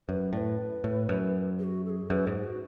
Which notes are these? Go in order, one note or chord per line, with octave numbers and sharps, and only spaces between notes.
F#2 B4
A2 B4 D5
A2
F#2
G#4
F#4
A4
G#4
F#2 B4
G#2 G#4
F#4